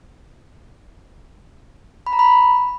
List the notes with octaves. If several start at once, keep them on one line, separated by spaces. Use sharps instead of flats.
B5
A#5
B5